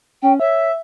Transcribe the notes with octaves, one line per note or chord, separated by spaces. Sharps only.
C#4 G5
C#5 E5